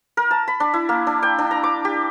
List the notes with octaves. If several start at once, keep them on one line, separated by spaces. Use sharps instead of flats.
A#4
A5
B5
D4
E4
A#3
D4
G5
D4
A#5
D6
G4